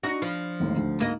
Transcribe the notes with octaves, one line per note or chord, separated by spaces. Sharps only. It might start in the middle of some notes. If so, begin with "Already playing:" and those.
D4 D#4 F#4 A#6 C#7
F3
G#1 D#2 A2
D2
G#2 A#3 D#5